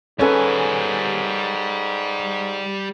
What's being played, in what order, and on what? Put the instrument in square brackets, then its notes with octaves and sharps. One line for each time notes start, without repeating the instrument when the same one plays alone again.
[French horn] G#2 [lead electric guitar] G3 G#5 [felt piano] C#4 A4 B4